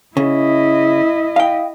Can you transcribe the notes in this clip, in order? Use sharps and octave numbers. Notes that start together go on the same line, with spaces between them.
C#3 E4 D#5
F5 G5